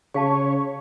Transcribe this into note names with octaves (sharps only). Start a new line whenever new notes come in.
C#3 G#4 C#5 F5 A5 C#6